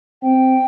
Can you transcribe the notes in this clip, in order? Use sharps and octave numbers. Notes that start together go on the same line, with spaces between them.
C4 G5